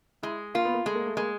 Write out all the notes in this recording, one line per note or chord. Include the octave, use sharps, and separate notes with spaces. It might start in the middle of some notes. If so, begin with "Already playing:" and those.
G#3 E4
A#3 F4
B3
A#3
G#3 A3
A#3
A3
G#3 A#3